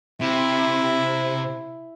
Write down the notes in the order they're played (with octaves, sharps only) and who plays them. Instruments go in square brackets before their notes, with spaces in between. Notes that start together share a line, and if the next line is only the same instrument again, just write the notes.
[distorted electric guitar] C3 [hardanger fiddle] E4